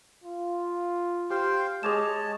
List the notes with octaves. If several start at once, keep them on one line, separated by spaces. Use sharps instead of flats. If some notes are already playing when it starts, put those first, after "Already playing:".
F4
G4 C5 F5 G5
G#3 G#4 C#5 D#5 A5 D6 E7